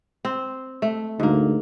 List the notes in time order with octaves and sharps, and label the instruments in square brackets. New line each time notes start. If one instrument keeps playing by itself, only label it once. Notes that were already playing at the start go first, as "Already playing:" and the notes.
[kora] C4
A3
[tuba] D2 [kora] G#2 A#3